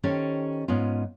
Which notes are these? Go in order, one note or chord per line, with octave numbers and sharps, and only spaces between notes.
D#3 C#4 G4 A4 C5
G#2 B3 C#4 F4